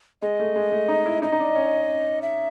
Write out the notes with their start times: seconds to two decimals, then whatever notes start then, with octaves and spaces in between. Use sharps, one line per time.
0.22 G#3 D#5
0.40 A3
0.56 G#3
0.72 A3
0.88 D#4
1.06 E4
1.22 D#4 D#5
1.32 D#4
1.40 D4
1.55 C#4
2.22 E5